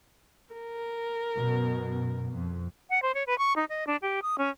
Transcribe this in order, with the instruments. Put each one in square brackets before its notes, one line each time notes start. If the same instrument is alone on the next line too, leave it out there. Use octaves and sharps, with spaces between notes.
[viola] A#4
[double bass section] F#2 B2
F2
[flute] F#5
C5
C#5
B4
C#6
D#4
D#5
D4
G4
D#6
C#4